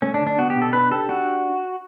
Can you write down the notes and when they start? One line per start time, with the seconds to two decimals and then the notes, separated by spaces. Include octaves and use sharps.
0.02 A3 C#4
0.14 D4
0.20 D3
0.27 D4
0.38 B3 F#4
0.50 G4
0.56 B2
0.62 A4
0.73 D4 B4
0.91 G4 A4
1.09 D4 F#4